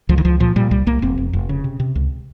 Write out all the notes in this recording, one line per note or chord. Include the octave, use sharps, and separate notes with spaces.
C#2 F3
D#3
C#2 F3
A#2 F3
A#2 G3
C2 G3
C2 A#3
F1 C4
F2
F1
C#3
C3
C3
C#2